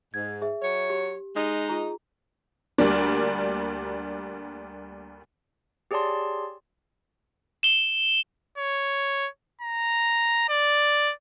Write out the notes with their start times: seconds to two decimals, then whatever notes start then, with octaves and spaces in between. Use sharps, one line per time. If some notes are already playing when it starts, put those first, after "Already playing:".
0.14 G#2 G#6
0.42 G#4 E5
0.62 F#3 C#5
0.90 G4
1.36 G#3 D#4
1.69 F4 G#4 A#5
2.78 D2 G3 A#3 D4
5.91 G4 G#4 C#5 D5 A5 C6
7.63 E7 G7
8.58 C#5
9.61 A#5
10.49 D5